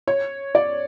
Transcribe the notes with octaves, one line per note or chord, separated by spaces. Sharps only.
C#5
D5